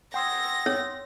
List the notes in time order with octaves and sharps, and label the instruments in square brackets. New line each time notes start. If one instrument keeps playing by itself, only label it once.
[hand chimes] F#5 D#6 G#6 [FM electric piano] G5 C6 E6 [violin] A#6
[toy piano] C#5